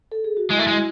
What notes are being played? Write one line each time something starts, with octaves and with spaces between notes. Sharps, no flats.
A4
G#4
F#4
G#3 E4
A3
G#3 F#4